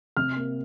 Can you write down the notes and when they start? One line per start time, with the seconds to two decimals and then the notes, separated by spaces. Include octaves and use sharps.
0.17 C3 F6
0.36 A#3